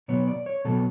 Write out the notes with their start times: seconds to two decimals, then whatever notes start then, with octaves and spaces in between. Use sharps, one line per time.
0.08 B2 F#3 B3 C#5
0.27 D5
0.46 C#5
0.65 B2 F#3 B3 A4